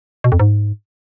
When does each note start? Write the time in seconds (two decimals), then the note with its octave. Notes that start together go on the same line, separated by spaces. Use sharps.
0.24 B2
0.32 F2
0.40 G#2